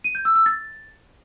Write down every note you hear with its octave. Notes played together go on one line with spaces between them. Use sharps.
D#7
G6
E6
E6
A6